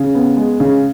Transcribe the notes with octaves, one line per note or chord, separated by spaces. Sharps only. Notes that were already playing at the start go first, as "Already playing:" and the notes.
Already playing: C#3
B3
G#3
C#3